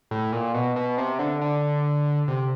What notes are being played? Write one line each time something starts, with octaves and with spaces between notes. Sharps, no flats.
A2
A#2
B2
B2
C3
D3
D3
C3